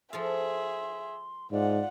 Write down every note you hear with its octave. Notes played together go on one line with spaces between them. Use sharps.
F3 G#4 A4 E5 F5 C6
G#2 F4 D5 F#5